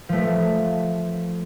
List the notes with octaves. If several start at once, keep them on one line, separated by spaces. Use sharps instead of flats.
F3 A3